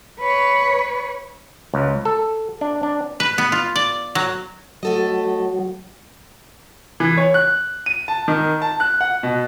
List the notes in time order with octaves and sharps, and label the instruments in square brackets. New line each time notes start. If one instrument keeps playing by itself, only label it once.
[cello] B4 C#5
[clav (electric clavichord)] C#2
A4
D4
D4
[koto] B4
B3
F4
D5
F#3
[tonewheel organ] F#3 [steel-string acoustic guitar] A3 A4 D#5
[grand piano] E3
C#5
F#6
D#7
A5
D#3
A5
F#6
F#5
B2